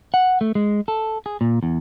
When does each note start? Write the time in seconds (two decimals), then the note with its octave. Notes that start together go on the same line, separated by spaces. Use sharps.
0.14 F#5
0.41 A3
0.55 G#3
0.88 A4
1.26 G#4
1.41 A#2
1.63 E2